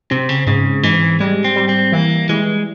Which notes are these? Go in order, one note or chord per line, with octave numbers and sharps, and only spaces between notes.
C3 C4
C#3
G#2 C#3
G#2 E3
G3 G#3
C4
G3
C4
E3 A#3
E3 G#3